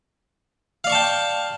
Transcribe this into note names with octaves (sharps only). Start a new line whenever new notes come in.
D5 F5 G5 A5 C#6